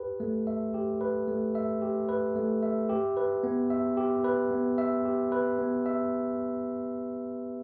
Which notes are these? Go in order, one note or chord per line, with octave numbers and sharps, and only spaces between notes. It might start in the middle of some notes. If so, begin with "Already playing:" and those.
Already playing: G4 B4
A3
E5
G4
B4
A3
E5
G4
B4
A3
E5
G4
B4
B3
E5
G4
B4
B3
E5
G4
B4
B3
E5